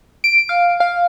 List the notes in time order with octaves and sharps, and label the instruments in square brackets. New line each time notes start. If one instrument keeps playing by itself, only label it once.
[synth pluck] D7
F5
F5